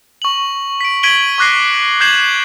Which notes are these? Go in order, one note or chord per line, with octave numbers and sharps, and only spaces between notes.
C#6 F#7
B6 D7
G#6 B6 D7 D#7 F#7 G7
C#6 D6 F#6 A#6 C7
D6 G6 G#6 C7 E7 F#7